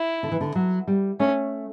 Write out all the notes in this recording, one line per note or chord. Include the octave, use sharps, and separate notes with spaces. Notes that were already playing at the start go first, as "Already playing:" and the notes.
Already playing: E4
D3
E3
D3
F#3
G3
A3 C#4